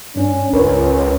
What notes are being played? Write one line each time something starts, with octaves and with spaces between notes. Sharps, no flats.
G2 C#4 D4
C#2 C#4 A#4 B4 C#5